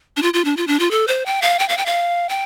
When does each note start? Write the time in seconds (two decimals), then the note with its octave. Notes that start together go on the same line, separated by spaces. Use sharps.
0.17 D4
0.22 F4
0.34 F4
0.45 D4
0.57 F4
0.67 D4
0.79 F4
0.91 A4
1.07 C5
1.26 G5
1.42 F5
1.59 G5
1.69 F5
1.78 G5
1.86 F5
2.29 G5